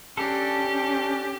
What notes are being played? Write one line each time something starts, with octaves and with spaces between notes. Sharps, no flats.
C#4 D4 G4 A4